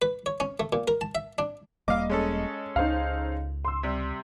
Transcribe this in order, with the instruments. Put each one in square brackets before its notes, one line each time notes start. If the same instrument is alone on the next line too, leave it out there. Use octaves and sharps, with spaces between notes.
[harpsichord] B4
C#5
C#4
A3
A#2
A#4
A5
E5
D4
[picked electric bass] E1 G3 A#3 [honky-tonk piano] D#5 [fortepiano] F5 D6
[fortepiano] G#3 C#4 A4
[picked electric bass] C#2 [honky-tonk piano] D#4 C5 F5
[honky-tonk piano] C6 E6
[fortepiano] C3 G3